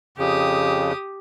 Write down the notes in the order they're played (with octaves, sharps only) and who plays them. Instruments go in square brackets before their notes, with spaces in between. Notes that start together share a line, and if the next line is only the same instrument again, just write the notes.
[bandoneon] F2 C#3 [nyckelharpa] G4 D#6